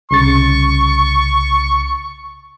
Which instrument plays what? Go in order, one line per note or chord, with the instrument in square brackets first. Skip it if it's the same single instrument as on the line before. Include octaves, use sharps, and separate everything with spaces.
[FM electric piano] C2 C#3 A6 [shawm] C#6